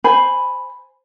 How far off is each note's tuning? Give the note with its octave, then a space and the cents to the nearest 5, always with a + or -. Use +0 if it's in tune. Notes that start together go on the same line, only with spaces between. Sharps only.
C5 +0 G#5 +0 B5 +0